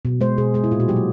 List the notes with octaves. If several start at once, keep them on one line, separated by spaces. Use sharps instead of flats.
B2
G#3 C5
B2 G#4
G#3 G#4
E4
A#2 F4
F#4
F#3 A#3 G4
F#4